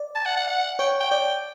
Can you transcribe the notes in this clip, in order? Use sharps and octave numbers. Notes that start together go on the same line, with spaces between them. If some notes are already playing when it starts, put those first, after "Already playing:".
Already playing: D5
A5
F#5
F#5
F#5
C#5 G5
G5
D5 G5